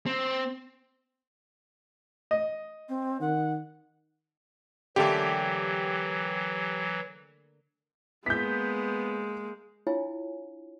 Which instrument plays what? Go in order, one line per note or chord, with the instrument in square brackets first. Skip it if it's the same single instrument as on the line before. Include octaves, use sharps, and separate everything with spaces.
[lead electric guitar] C4
[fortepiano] D#5
[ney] C4
[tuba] D#3 [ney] F#5
[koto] D3 A3 A#3 [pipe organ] E3 F#3 [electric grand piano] G4
[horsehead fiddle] G#3 A#3 [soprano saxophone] B3 [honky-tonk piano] G6 B6
[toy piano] D4 E4 F4 C#5 F5 G#5